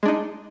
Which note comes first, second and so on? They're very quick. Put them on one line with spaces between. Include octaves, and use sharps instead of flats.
G#3 D4 D#4